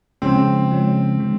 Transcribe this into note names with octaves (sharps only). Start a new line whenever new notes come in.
C#3 F3 G#3 C4 C#4
C#3 F3 G#3 C#4
D3 F3 G#3